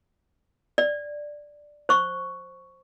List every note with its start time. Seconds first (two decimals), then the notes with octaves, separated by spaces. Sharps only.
0.78 D5
1.89 C5 C#6